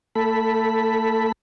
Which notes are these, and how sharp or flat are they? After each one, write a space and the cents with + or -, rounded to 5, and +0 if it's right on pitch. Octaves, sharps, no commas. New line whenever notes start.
A3 +40 A4 +0 B5 +0